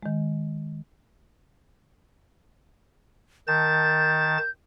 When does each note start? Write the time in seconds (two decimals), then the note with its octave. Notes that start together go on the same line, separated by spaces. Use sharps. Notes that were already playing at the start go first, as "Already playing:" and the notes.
0.03 D#3 G#3
3.48 D#3 A5 G6 A6